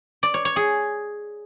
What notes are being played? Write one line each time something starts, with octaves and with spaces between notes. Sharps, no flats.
D5
C#5
C#5
G#4